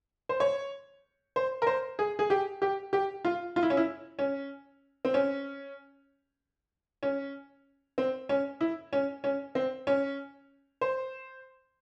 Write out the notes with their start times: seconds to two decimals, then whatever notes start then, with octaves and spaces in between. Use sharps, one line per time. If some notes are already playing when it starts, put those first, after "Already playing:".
0.29 C5
0.40 C#5
1.36 C5
1.62 A#4
1.67 C5
1.99 G#4
2.19 G#4
2.30 G4
2.62 G4
2.93 G4
3.25 F4
3.56 F4
3.63 E4
3.70 C#4
3.77 E4
4.19 C#4
5.05 C4
5.14 C#4
7.03 C#4
7.98 C4
8.29 C#4
8.61 E4
8.93 C#4
9.24 C#4
9.55 C4
9.87 C#4
10.81 C5